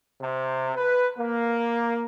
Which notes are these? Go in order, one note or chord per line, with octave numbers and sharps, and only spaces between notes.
C3
B4
A#3